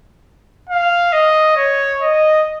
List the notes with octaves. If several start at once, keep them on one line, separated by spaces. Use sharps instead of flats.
F5
D#5
C#5
D#5